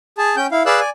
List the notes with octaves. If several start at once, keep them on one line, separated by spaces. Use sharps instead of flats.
G#4 A5
C#4 G5 G6
E4 F5
G#4 B4 D5 F5 E6 F#6
D5 G#5